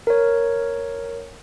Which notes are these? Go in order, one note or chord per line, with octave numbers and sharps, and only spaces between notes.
A#4 C#5